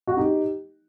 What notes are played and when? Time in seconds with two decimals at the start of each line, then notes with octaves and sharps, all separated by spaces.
0.07 F#4
0.17 D#4 G4